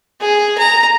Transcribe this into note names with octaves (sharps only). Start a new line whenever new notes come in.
G#4
A#5